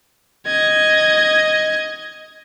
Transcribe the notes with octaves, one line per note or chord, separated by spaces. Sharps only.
D#5 G#6